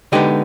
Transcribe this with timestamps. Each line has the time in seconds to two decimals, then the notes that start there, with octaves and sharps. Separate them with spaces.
0.12 D3 G#3 B3 D#4 G4